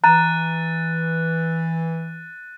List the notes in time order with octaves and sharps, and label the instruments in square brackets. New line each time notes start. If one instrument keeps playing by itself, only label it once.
[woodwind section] E3 [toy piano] A#5 [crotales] F#6 A6 D#7